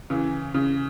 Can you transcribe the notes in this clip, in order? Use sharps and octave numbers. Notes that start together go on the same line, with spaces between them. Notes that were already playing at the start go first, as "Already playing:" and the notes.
C#3 E3
C#3